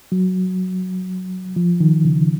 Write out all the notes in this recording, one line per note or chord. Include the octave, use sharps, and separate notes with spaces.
F#3
F3
D#3
C#3